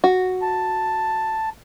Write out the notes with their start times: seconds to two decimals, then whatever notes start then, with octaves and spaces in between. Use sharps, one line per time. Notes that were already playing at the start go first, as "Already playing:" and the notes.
0.04 F#4
0.42 A5